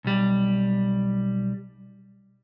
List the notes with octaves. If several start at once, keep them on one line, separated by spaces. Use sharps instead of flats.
B1 G3